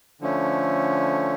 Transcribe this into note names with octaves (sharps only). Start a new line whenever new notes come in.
D3 F3 A3 C#4